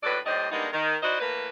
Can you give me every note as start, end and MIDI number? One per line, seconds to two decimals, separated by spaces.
0.03 0.17 39
0.03 0.17 45
0.03 0.17 66
0.03 0.17 69
0.03 0.17 71
0.03 0.17 74
0.25 0.47 39
0.25 0.47 45
0.25 0.47 55
0.25 0.47 62
0.25 0.47 72
0.25 0.47 75
0.52 0.67 55
0.52 0.67 56
0.52 0.67 58
0.52 0.67 59
0.52 0.67 62
0.52 0.67 63
0.72 0.96 51
1.03 1.20 63
1.03 1.20 64
1.03 1.20 66
1.03 1.20 72
1.03 1.20 74
1.03 1.20 75
1.20 1.49 45
1.20 1.49 52
1.20 1.49 58
1.20 1.49 71